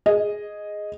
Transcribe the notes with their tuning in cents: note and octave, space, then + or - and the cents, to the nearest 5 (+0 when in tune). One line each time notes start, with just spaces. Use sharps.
G#4 +0 D#5 +0